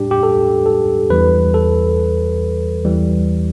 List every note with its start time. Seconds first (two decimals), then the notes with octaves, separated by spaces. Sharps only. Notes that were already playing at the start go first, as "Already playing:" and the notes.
Already playing: A2 G3 D4 G4
0.11 G4
0.23 A4
0.66 A4
1.10 E2 E3 G3 B4
1.54 A4
2.85 E2 E3 G3